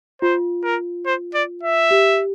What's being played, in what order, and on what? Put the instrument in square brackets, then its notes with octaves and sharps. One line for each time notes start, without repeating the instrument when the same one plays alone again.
[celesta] F4 [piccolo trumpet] C5
[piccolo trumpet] A#4
C5
D5
E5
[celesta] G4